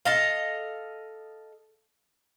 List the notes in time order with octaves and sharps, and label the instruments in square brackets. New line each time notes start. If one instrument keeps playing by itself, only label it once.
[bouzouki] A4 D#5 F5